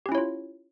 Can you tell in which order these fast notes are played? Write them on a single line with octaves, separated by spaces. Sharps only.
G4 C#4 E4 C#5 F4